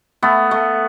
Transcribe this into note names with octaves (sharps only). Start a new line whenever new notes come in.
A3 B3
A3